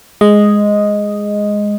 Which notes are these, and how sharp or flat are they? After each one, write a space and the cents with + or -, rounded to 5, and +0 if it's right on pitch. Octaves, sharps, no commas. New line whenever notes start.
G#3 +0 D#5 +0